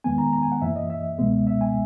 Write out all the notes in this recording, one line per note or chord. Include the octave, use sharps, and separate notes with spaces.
D#2 D#3 G#3 B3 G#5
A#5
A#5
G#5
F#5
F#2 E3 A#3 E5
D#5
E5
C#2 B2 G#3 B3
E5
G#5